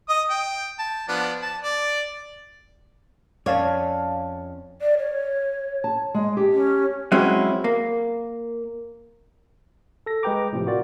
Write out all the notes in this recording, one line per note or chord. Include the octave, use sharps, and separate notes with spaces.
D#5 D#6
G5
A5
F3 B3 D4
A5
D5
F2 C#4 C#5 D5 F5 A5
D5
C#5
A5
G#3
G4
C#4
F#3 G#3 C4 C#4 E4
A#3
A4 A#6
G#3 G#4 B4 G5 A#5 D6
A2 C3 F3
F4 F#4 A#4 D5